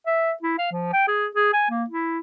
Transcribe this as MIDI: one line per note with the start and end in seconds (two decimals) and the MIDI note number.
0.06 0.32 76
0.42 0.54 64
0.58 0.67 77
0.72 0.90 53
0.93 1.06 79
1.07 1.26 68
1.35 1.52 68
1.53 1.68 80
1.70 1.84 58
1.90 2.19 64